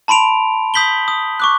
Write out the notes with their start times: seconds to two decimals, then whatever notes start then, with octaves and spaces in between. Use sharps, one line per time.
0.08 A5 B5 C6 D7 F7
0.74 D#6 G6 B6 F#7 G7
1.08 D#6
1.40 C#6 D6 F#6